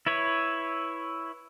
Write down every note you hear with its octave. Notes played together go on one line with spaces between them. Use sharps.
E4 B4 C#5